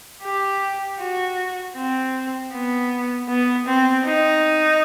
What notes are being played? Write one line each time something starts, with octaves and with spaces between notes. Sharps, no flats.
G4
F#4
C4
B3
B3
C4
D#4